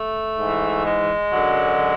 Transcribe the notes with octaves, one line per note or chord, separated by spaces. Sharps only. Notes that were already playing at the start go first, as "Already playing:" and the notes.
Already playing: A3
G#2 E3
G#3
F#2 D3 F#3